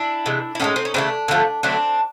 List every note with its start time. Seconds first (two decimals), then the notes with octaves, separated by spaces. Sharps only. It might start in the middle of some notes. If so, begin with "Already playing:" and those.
Already playing: D4 E4
0.26 C3 E3 G#3
0.55 E4
0.60 A2 F3 G#3 C#4 D#4
0.76 C4
0.85 C#4
0.94 C#3 E3 A3 C4 D4
1.28 D3 F3 A3
1.63 D3 F#3 A3 C4 D4